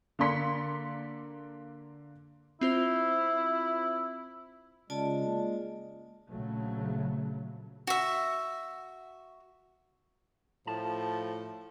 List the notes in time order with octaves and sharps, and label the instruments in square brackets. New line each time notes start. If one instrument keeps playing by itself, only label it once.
[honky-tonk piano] D3 A#3 D5 C6 B6 C#7
[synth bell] C4 F4 C5 [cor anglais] E4
[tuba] C#3 [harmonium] G#3 [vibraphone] F4 D5 A5
[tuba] A#3
[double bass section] A#1 C#3 F#3 A3
[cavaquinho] F#4 E5
[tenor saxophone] A2 [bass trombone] F3 [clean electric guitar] A5